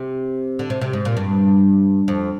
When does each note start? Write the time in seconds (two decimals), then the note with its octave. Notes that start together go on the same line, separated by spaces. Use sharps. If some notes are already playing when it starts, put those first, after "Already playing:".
Already playing: C3
0.59 D3
0.70 C3
0.82 C3
0.93 G#2
1.05 A#2
1.17 G2
2.08 F2